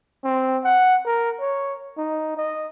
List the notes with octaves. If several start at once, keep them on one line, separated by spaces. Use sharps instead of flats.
C4
F#5
A#4
C#5
D#4
D#5